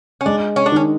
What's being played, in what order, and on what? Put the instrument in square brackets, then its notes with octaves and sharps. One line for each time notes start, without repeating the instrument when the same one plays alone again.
[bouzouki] C#4
[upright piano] G#3 [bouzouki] D4
[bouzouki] C#4
D4
[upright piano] D#3 [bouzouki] C#4